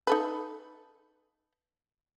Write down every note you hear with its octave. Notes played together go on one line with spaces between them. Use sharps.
D#4 A4 B4